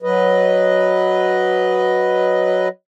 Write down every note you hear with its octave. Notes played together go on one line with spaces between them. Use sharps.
F#3 B4 D#5